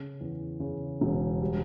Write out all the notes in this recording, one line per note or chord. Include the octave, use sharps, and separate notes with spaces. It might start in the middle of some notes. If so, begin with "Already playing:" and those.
Already playing: C#3
E2
C#3
E1
G3